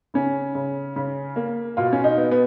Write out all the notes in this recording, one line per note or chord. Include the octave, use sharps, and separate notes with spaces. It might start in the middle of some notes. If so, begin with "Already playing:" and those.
C#3 C#4
C#3
C#3
A#3
B2 F4
C#4
D#4
B3
B3